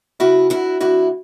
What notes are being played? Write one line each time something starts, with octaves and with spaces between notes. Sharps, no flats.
C#3 E4 F#4
D2 E4 F#4
D2 E4 F#4